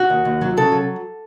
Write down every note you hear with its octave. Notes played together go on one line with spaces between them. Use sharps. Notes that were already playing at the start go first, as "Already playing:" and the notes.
Already playing: F#4
D#2
D#2
F#3
C#3 A4
F#3